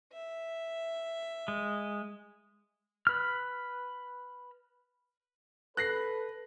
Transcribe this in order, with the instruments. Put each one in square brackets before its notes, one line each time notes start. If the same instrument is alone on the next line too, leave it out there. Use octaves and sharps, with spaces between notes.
[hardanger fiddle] E5
[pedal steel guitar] G#3
B4 F6
[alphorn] A4 [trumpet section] B4 [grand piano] F#6 A#6 C7